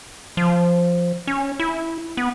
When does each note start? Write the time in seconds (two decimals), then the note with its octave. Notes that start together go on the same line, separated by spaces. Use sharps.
0.37 F3
1.27 C#4
1.60 E4
2.17 B3